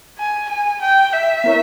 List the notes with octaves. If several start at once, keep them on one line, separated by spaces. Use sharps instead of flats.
G#5
G#5
G5
E5
B3 E4 A#4 C#5